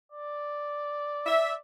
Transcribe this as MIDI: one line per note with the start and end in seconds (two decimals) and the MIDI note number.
0.12 1.59 74
1.26 1.52 76